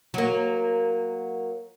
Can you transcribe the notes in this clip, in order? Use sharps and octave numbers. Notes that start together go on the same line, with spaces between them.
F#3 A#3